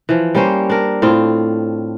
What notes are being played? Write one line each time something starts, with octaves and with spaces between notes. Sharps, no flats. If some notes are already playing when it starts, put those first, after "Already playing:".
E3 F3
G3 A#3 C#4 C5
D4 A#4
A2 C4 F4